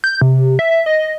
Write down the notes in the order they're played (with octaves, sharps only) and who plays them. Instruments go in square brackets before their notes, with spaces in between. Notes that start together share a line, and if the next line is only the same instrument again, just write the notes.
[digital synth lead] G6
C3
E5
D#5